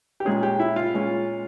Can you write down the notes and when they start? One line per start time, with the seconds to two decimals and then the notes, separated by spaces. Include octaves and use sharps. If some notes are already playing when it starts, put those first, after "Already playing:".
0.20 G4
0.25 A#2 G#3 C#4 G#4
0.43 G4
0.60 E4
0.76 F4
0.94 A#2 G#3 C#4